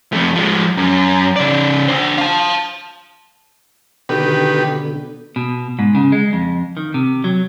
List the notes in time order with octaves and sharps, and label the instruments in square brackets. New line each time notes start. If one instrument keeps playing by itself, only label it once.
[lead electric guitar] F2 A3
F3 G#3
F#2
C#3 D5
D4 C5
F5 A5
[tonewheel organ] B2 D3 [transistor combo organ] D#3 G4 B4
[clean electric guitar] B2
G#2
C#3
G#3
F2
D#3
C3
F#3